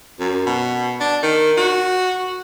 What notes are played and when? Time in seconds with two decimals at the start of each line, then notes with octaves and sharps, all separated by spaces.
0.20 F#2
0.46 B2
1.00 D4
1.23 D#3
1.57 F#4